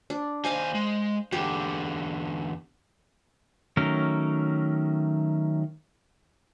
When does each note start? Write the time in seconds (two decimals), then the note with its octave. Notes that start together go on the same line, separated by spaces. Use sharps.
0.10 D4
0.45 D#2 C5 D#5 F5 G#5
0.75 G#3
1.32 E2 D3 G4
3.77 D#3 F#3 A3 C#4 A#4